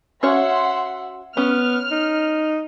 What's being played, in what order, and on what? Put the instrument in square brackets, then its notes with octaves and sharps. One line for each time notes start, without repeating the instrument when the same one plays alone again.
[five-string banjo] C#4 F#4 C#5 [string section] E5 F#5 C6
[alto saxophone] B3 [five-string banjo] C#4 [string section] F6
[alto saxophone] D#4